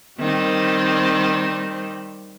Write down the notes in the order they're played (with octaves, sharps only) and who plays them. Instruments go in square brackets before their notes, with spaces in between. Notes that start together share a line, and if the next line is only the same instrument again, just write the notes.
[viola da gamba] D#3 G3 C4